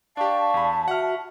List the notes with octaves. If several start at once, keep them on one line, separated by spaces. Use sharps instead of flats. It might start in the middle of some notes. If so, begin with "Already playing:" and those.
D4 G4 D5 F5 A5 C#6
E2 B5
F#4 E5 F#5 F6